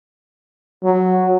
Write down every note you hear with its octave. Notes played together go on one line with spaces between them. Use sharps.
F#3